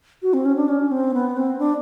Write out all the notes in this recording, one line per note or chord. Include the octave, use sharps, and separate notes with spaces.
F#4
C4
C#4
D4
C#4
C4
B3
C4
D4